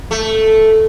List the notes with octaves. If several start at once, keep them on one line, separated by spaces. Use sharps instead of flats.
A3